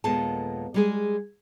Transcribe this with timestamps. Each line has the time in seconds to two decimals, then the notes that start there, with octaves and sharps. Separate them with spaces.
0.04 D#2 A#2 G#3 B3 A4 A5
0.74 G3 G#3 G#4